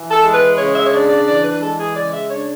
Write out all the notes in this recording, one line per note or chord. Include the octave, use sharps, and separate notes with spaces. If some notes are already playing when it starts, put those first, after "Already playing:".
Already playing: E3
A4
G#3
B4
C#3 C#5
E5
C#5
D4 D5
D5
E3 D5
B4
G#3 A4
G#4
C#3 D5
E5
D4 C#5